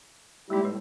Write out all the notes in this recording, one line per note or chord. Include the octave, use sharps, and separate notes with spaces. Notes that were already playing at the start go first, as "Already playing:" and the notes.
G3 G#3 A#3 D#4 E4 G4
A2 G3 B4 C#5